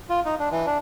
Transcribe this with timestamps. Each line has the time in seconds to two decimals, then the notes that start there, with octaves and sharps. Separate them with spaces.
0.09 F4
0.25 D#4
0.39 D4
0.52 E3
0.66 D4